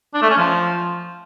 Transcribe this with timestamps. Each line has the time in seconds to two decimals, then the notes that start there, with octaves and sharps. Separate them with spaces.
0.14 D4
0.22 A3
0.30 C#4
0.38 F3